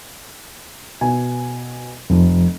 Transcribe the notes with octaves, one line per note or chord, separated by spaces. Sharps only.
B2 G#5
F1 F2 F3